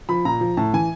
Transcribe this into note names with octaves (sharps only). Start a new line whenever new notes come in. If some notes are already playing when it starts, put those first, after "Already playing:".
F3 B5
A#2 A#5
F3
A2 A5
E3 G#5